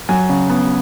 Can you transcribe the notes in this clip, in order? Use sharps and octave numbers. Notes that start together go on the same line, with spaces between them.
F#3 G#5
C#3
B3